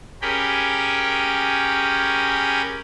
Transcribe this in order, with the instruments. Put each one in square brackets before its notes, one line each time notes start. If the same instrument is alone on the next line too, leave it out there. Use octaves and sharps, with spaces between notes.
[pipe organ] C#4 G4 G#4 A#4 G5 B5